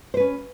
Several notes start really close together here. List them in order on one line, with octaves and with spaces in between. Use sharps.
C5 B4 C#4